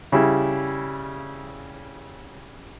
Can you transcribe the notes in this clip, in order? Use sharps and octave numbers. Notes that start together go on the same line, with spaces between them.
C#3 G3 E4